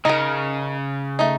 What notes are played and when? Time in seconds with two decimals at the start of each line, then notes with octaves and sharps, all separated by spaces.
0.05 C#3 D#4 A#4
1.19 A3 D#4